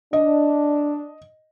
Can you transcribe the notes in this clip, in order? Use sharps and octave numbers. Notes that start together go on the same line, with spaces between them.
D4 D#5